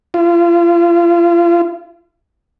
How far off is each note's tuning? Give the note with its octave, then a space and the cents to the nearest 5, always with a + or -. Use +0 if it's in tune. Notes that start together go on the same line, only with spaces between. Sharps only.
F4 -35